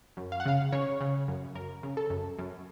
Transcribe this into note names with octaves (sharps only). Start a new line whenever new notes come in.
F#2
F5
F#5
C#3 F5
C#3 C#5
C#3
F#2
F#2 A#4
C#3
A4
F#2
F#2